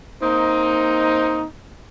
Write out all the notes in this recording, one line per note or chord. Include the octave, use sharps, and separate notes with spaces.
A#3 C4 D#4